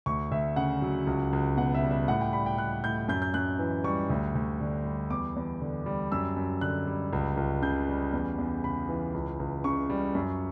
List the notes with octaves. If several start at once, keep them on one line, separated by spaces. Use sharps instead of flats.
D2 C#6
D2 E5
C#3 F#5
F#3
C#2
C#2
B2 F#5
E5
G3
E5
A2 F#5
G5
G3 B5
G5
G3 F#6
A2 G6
F#2 G6
G6
F#2 F#6
E3
G3 C#6
D2
D2
D3
G3
E2 D6
E2
D3
G3
F#2 E6
F#2
D3 F#6
G3
C#2
C#2
C#3 G6
G3
E2
E2
C#3 B5
E3
C#2
C#2
C#3 C#6
G3
F#2